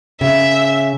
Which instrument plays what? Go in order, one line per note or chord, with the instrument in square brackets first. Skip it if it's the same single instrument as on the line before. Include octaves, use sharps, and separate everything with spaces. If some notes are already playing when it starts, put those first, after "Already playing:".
[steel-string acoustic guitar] C#3 [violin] E5